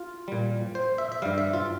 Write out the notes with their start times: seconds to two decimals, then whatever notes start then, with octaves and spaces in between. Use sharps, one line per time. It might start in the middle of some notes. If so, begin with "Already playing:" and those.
Already playing: F4
0.28 A#2 G3
0.75 C5
0.98 E5
1.12 E5
1.22 G2 G3 F5
1.38 E5
1.53 F4